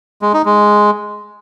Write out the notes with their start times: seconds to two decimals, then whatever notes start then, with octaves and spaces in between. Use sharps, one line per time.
0.22 G#3
0.34 D#4
0.45 G#3